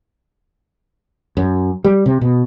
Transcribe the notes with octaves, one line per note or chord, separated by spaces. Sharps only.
F#2
G3
C3
B2